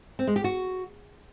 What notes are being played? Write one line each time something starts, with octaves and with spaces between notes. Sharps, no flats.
C4
G#3
G4
F#4